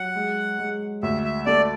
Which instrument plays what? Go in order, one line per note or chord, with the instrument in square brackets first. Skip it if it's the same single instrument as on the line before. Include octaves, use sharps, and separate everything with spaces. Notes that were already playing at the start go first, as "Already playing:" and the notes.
Already playing: [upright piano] F#3 [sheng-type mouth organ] F#5
[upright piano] G#3
G#3
[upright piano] D2 [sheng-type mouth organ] E5
[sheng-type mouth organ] E5
[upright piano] A3 [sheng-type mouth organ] D5